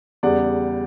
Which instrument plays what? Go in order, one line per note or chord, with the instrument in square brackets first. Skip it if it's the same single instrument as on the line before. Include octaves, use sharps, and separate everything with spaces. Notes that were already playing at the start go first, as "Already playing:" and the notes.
[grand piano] E2 C#3 G3 D5 F#5